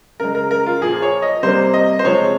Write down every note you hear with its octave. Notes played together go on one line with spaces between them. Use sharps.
C#3 G#3 A#4
A#4
A#4
F4
A#2 F3 A#3 G#4
C#5
D#5
C3 G3 A#3 C5
D#5
C5
C3 F3 G#3 C#5